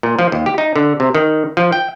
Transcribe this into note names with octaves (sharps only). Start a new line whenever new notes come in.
A#2
F3
D#2
G4
D#4
D3
C3
D#3
F3
G5